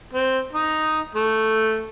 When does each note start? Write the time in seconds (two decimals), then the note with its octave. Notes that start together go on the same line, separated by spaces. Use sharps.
0.13 C4
0.53 D#4
1.15 A3